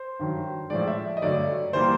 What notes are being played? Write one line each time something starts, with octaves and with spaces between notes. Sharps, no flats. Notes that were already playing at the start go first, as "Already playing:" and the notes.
Already playing: C5
G2 D#3 F#3
A2 F3 G#3 D5
E5
D#5
G2 D3 F#3 A3 D5
E3 G3 A#3 C5